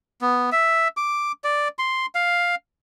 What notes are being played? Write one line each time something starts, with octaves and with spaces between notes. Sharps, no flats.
B3
E5
D6
D5
C6
F5